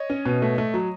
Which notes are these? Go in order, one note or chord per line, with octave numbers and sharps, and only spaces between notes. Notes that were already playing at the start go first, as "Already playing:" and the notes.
Already playing: C#5 D#5
C#4
B2
A3
A3
F#3